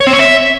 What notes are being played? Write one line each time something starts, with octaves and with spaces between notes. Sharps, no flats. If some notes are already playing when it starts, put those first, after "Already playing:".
C#5
C4
C#5
E5